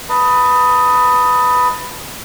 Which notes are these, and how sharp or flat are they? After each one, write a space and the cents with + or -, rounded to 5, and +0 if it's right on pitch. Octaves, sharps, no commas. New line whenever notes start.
B4 +0 D#5 +10 A5 +35